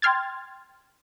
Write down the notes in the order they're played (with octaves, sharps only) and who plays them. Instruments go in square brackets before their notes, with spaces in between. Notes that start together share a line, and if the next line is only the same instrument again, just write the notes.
[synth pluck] G5 C6 F6 G#6 A6